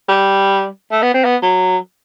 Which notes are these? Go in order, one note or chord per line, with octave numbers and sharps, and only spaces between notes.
G3
A3
B3
C4
B3
F#3